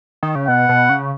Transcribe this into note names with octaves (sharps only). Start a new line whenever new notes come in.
D#3
C#3
B2 F#5
B2
C#3